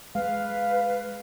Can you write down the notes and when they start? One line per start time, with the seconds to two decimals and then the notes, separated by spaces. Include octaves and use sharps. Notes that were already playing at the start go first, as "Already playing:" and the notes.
0.15 G#3 B4 F5